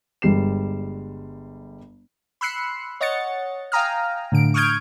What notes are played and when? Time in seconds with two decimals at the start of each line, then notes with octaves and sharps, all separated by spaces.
0.22 G1 G3 G#3 C7 E7
2.41 B5 C6 E6 F#6 C7 C#7
3.01 C#5 D#5 F#5 A6 C#7
3.72 F5 G5 G#5 A#5 D#6 F6
4.32 A2 D3 D7
4.54 C#6 D#6 F6 G6 G#6 D7